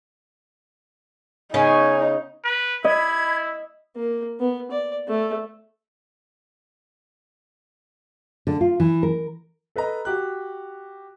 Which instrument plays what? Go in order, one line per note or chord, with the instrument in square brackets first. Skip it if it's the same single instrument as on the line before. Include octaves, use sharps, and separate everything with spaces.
[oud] C#3 B3 C#4 [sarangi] D#4 [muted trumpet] G#5
[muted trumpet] B4
[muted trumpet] E4 [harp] D#5 [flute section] B5 G#6
[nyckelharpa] A#3
B3
D5
A3
[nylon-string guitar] D3
F4
E3
A#4
[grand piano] A4 B4 D#5 A#5
F#4 G4 F#6